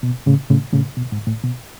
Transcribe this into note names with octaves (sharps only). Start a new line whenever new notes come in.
B2
A2 C#3
A2 C#3
A2 C#3
B2
G#2
A2
B2